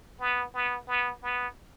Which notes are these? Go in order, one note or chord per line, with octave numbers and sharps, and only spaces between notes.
B3
B3
B3
B3